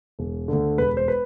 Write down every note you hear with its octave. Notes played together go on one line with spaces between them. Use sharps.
E1
D2 D3
E1 B4
C5
B4